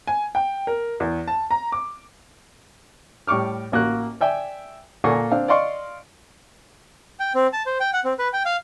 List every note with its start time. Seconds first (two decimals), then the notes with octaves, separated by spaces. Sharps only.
0.07 G#5
0.35 G5
0.67 A#4
1.00 E2
1.28 A5
1.51 A#5
1.72 D6
3.27 A2 G3 C#6 D6 F6
3.72 A1 A#3 F#4 F#6
4.21 D5 E5 G5 G#5
5.04 A#2 A#3 A4 F#5 G#5 C#6
5.32 C4 D4 F5
5.48 D5 D#5 F5 C6 C#6
7.20 G5
7.35 C4
7.53 A5
7.66 C5
7.80 G5
7.93 F#5
8.04 C4
8.19 B4
8.33 G5
8.45 F5